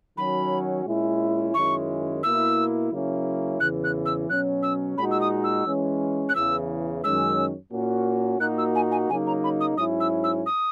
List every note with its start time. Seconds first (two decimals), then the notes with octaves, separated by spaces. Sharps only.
0.17 D#3 F#3 C#4 F#4 B5
0.86 A#2 G#3 C#4 E4
1.54 F#2 D#3 G#3 C#4 E4 C#6
2.23 B2 A#3 E4 E6
2.92 C#3 F#3 A#3 C#4 E4
3.60 E2 C#3 E3 F#6
3.84 F#6
4.06 E6
4.29 B2 F#3 C#4 F#6
4.63 E6
4.98 A#2 G#3 D#4 F#4 B5
5.11 E6
5.21 D#6
5.44 E6
5.66 E3 G#3 C#4
6.29 F#6
6.35 E2 C#3 E3 E6
7.04 F#2 D#3 G#3 C#4 E6
7.71 A#2 A#3 C#4 F#4
8.40 A#2 A#3 D#4 F#4 F#6
8.58 E6
8.75 G#5
8.91 G#5
9.09 C#3 F#3 A#3 D#4 G#5
9.27 A#5
9.44 B5
9.60 D#6
9.77 G#2 F#3 C#4 E4 D#6
10.00 E6
10.24 E6
10.46 D#6